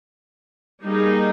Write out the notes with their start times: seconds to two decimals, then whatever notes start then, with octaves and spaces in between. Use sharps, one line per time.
0.84 G3 A#3 D#4 G#4